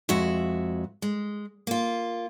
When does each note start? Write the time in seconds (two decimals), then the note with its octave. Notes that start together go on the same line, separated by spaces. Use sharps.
0.09 F2 G#3 F#4 E5
1.02 G#3
1.67 A#3 F4